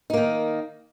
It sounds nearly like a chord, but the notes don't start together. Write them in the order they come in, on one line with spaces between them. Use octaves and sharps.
D#4 A#3 D#3